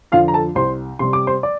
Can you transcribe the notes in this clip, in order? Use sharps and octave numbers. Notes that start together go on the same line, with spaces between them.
F2 D3 F3 F4 F5
A#5
A4 A5
C2 C5 C6
C3 G3 C6
D6
C5 C6
D5 D6